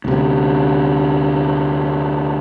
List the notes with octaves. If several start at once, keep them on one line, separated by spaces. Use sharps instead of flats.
D2 C3